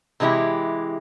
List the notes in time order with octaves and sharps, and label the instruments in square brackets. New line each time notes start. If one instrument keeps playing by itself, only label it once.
[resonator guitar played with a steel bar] C3 E3 G#3 E4 G4